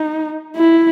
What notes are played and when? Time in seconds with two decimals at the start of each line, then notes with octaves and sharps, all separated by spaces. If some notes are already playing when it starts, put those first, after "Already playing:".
Already playing: D#4
0.56 E4